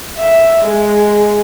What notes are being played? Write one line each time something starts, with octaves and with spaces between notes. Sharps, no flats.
E5
G#3